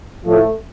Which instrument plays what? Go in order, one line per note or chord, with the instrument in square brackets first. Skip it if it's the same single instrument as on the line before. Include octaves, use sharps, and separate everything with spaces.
[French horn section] A2 F3 A3